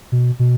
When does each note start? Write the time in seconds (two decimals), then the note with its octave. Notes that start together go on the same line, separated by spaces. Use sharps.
0.12 B2
0.39 B2